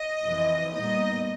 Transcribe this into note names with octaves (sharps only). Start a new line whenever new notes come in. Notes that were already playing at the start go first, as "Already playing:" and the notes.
Already playing: D#5
F2 C3 E3
A#2 G3 B3 D#4 D#5